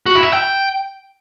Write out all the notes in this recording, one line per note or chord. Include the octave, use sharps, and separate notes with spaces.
F#4
E4
E5
G5